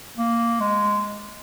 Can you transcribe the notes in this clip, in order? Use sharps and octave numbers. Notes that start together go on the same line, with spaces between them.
A#3
G#3